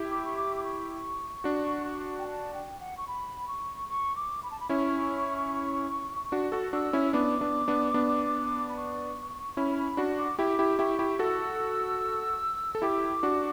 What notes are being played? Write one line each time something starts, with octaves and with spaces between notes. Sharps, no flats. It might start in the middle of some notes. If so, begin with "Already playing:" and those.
Already playing: E4 G4
D6
C#6
D6
D6
C#6
D4 F#4
G5
A5
G5
F#5
C#6
B5
C#6
C#6
D6
B5
A5
B5
C#4 E4 C#6
D4 F#4
F#4 A4
D4 F#4 E6
C#4 E4
B3 D4 D6
B3 D4
B3 D4
B3 D4
B5
C#6
C#4 E4 B5
B5
D4 F#4
D6
E4 G4 D6
E4 G4
E4 G4 C#6
E4 G4
F#4 A4 E6
A4
E4 G4 D6
D4 F#4